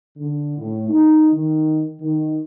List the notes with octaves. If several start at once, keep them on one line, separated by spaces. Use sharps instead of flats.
D3
A2
D#4
D#3
D#3